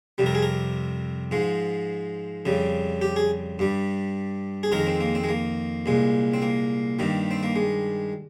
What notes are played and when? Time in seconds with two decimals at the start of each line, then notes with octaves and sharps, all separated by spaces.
0.18 F2 C3 G3
0.26 A#4
0.35 G#4
0.42 A#4
1.31 G#2 F3 G#3
2.45 F2 C#3 G3
3.01 G4
3.16 G#4
3.59 G2 G3
4.63 G#4
4.72 F2 D#3 G#3 A#4
4.87 C4
5.00 A#3
5.15 C4
5.24 G#3
5.29 A#3
5.86 C2 A#2 G#3
6.34 C4
6.42 A#3
6.99 G2 D#3 G3
7.31 C4
7.43 A#3
7.56 G#3